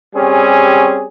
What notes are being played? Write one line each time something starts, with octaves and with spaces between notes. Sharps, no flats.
G3 C4 C#4 G4 G#4